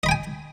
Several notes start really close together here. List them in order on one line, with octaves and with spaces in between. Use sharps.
D#5 B5 G5 G#5